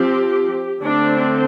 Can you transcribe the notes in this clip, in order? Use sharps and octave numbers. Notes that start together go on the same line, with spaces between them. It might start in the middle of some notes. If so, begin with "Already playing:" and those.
Already playing: F3 C4 G4
D3 A3 C4 D4